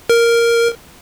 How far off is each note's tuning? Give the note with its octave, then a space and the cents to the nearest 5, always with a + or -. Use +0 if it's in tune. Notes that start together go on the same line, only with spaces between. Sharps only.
A#4 +0